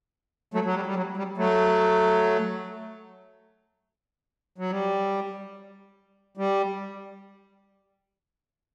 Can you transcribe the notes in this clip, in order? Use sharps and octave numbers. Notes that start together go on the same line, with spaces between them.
F#3 A3
F#3
G3
G3
F#3
G3
F#3 A3
F#3
G3
G3